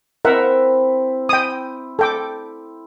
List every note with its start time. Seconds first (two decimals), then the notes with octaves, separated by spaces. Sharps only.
0.25 C4 E4 A#4 E5 F#5
1.29 G5 D#6
1.99 A4 G5 D6